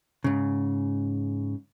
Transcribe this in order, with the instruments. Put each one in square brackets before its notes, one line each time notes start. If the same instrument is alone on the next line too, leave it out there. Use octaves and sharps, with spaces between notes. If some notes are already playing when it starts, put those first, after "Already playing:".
[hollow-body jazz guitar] G#2 C#3